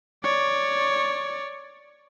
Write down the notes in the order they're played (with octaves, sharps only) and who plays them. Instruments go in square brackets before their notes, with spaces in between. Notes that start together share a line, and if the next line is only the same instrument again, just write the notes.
[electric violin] C#5 D5